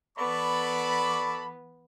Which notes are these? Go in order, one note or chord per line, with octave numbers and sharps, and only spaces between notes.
E3 B3 A4 D5 A5 B5 C#6 D6